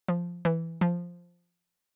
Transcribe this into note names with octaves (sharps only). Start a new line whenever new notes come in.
F3
E3
F3